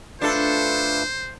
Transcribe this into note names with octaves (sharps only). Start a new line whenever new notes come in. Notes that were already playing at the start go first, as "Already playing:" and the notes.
A3 D4 F4 A4 B4 C5